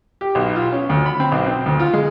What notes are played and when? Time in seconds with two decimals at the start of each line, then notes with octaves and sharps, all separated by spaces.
0.21 G4
0.35 B1
0.56 F4
0.72 C#4
0.89 D2
1.06 B5
1.20 C4
1.32 B1
1.46 C4
1.66 D2
1.80 F4
1.94 G#3